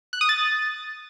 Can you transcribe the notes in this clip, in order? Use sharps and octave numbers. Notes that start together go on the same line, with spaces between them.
F#6
D#6
A6